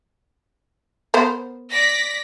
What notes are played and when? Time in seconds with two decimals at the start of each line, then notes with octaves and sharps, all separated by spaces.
1.14 B3 A#4 C5
1.71 D5 A#6 B6